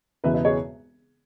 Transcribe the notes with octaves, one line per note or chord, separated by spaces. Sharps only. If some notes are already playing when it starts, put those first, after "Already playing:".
E1 E2 C#3 E3 B4 E5
B4 E5
G#4 C#5